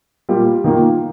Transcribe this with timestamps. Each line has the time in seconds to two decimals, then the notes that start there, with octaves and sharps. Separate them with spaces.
0.29 A#2 G3 A#3 F4
0.64 D#3 A#3 F4